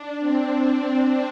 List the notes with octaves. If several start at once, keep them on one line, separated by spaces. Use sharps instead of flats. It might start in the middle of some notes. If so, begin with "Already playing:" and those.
Already playing: D4
C4